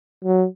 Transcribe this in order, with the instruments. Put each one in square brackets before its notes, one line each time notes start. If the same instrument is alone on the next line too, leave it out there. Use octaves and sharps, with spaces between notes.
[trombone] F#3